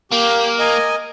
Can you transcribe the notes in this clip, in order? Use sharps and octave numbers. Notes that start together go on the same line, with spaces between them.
A#3 G4
A#4 D#5 G#5